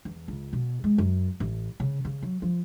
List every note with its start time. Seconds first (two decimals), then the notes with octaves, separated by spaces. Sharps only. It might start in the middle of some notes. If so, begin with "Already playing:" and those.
0.05 E2
0.28 C#2
0.53 B2
0.84 G#3
0.98 F#2
1.40 A1
1.80 C#3
2.05 C#3
2.23 F#3
2.42 F3